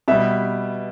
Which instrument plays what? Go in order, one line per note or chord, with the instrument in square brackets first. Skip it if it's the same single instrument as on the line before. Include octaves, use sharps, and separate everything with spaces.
[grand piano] B2 G3 E5